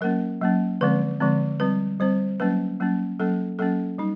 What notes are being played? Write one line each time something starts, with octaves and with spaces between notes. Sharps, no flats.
F#3 A#3 C#4 A#4
F#3 A#3 C#4
D3 F3 G#3 C4 B4
D3 F3 G#3 C4
G3 C4 B4
G3 C4 C5
F#3 A#3 C#4 B4
F#3 A#3 C#4
F#3 A#3 C#4 A4
F#3 A#3 C#4 A4
G3 D#4